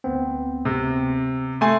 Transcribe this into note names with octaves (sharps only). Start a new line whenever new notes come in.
D2 B3 C4
C3
A3 G#5 C6